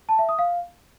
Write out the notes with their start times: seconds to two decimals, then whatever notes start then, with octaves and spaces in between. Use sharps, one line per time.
0.09 A5
0.19 E5
0.29 D#6
0.39 F5